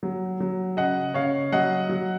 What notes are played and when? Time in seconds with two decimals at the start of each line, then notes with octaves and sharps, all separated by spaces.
0.03 F#3
0.40 F#3
0.77 C#3 D#5 F#5
1.14 C#3 C#5 F5
1.52 F#3 D#5 F#5
1.89 F#3